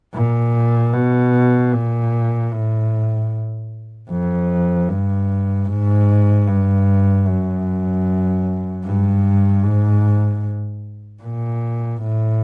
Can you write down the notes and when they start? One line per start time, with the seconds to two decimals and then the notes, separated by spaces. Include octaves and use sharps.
0.15 A#2
0.94 B2
1.73 A#2
2.52 A2
4.10 F2
4.89 G2
5.68 G#2
6.47 G2
7.27 F#2
8.85 G2
9.64 G#2
11.23 A#2
12.02 A2